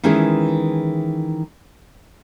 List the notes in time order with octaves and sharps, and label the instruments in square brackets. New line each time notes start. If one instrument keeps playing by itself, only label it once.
[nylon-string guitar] D#3 E3 G#3 C#4 E4 G#4